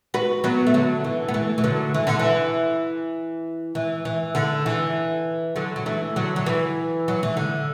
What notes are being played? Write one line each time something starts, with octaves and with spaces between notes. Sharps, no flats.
F#4 B4
F#3 B3
A3
D3 F#3
E3
B3
E3 A3
E3
D3 F#3
E3
D3
E3
E3
E3
D3
E3
D3 F#3
F#3
E3 A3
D3 F#3
F#3
E3
F#3
E3
D3